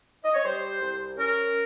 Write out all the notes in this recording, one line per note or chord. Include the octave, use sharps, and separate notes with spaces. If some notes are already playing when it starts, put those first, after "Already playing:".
D#5
C#5
G3 C5
C2
C#4 A#4